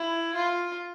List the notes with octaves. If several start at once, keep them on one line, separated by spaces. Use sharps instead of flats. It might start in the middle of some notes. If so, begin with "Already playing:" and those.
Already playing: E4
F4